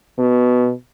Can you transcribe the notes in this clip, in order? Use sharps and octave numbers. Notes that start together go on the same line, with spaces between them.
B2